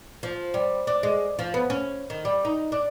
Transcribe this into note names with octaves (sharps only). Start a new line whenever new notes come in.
F3
G3
D4
G#3
F3
B3
C#4
D#3
G3
D#4
D4